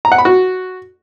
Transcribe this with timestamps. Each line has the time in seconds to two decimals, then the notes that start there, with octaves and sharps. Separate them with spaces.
0.05 A#5
0.12 F#5
0.18 B5
0.25 F#4